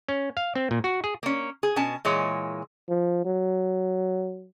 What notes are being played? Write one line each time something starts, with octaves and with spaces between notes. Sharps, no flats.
C#4
F5
C4
A#2
F#4
G#4
A#3 C#4
G#4
B2 C#4 G#5 A5
A#2 E3 G#3 C#5
F3
F#3